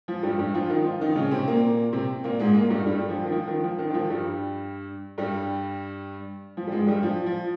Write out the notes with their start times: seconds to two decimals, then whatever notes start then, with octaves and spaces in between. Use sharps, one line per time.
0.08 F3
0.23 G2 G3
0.39 G2 G3
0.54 F3 F4
0.70 D#3 D#4
0.85 F3 F4
1.01 D#3 D#4
1.16 C#3 C#4
1.31 C3 C4
1.47 A#2 A#3
1.93 C3 C4
2.24 A#2 A#3
2.39 G#2 G#3
2.55 A#2 A#3
2.70 G2 G3
2.85 G2 G3
2.99 G3
3.09 F3
3.24 D#3
3.32 F3
3.48 D#3
3.64 F3
3.79 D#3
3.90 D#3
3.94 F3
4.10 G2 G3
5.18 G2 G3
6.57 F3
6.67 G3
6.71 G#2 G#3
6.87 G2 G3
7.03 F3
7.26 F3